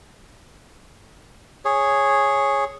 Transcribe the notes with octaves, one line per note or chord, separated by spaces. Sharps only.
G#4 C#5